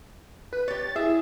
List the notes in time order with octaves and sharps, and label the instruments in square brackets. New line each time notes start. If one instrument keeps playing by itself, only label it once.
[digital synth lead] B4
[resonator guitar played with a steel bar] G4 C#5 [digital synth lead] A6
[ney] E4 [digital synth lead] G#4 [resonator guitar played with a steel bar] E5